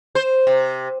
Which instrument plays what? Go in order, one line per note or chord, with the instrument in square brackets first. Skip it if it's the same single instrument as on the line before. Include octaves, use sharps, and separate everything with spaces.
[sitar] C5
C3